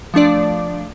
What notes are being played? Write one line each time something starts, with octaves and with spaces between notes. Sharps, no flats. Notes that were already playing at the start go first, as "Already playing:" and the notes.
F3 A3 D4 D5